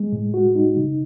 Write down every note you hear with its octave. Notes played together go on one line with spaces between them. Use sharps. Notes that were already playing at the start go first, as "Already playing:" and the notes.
Already playing: G#3
A2
F#4
D#4
C#3